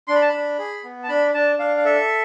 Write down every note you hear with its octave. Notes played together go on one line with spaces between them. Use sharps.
D4 C6
B5
A5
D4 B5
G#4
B3
A5
D4 B5
D4 A5
D4 F5
F5
A4 E5